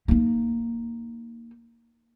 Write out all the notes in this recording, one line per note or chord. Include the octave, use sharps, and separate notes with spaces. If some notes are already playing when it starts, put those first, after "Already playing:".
A#3 D#4